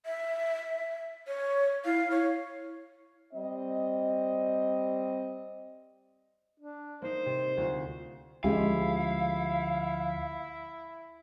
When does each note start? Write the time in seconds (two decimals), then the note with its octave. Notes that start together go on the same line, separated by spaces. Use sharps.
0.05 E5
1.27 C#5
1.85 E4 F5
2.11 C#5
3.33 G3 C4 D#5
6.60 D4
7.02 A#3 D#4 C5
7.26 C3
7.57 D2 F4
8.44 D2 F3 G#3 C#4 E4 G4 F5